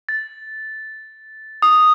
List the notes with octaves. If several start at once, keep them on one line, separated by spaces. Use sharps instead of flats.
A6
D#6